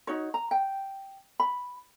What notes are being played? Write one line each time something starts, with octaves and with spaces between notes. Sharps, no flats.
D#4 F#4 C#5
A#5
G5
B5